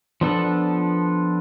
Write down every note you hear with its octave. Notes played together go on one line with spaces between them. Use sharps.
F3 B3 D4 A4